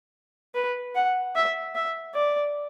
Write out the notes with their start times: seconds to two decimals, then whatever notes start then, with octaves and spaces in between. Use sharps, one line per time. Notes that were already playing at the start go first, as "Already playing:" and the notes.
0.55 B4
0.95 F#5
1.35 E5
1.75 E5
2.14 D5